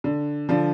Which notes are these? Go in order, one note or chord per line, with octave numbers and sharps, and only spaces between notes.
D3
D3 F3